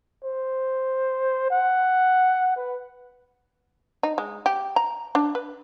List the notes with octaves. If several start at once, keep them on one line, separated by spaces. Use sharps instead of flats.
C5
F#5
B4
D#4
G#3
G4
A#5
D4
B4